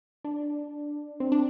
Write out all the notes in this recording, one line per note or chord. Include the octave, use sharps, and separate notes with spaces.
D4
C4
D4